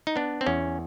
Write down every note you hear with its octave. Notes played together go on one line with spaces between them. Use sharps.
D#4
B3 D4
C4
E2 C#4